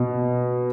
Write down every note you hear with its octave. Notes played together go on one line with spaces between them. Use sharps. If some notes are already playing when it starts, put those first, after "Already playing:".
Already playing: B2